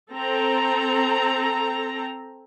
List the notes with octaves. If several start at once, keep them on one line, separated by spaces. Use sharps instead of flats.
C4 A4 A#5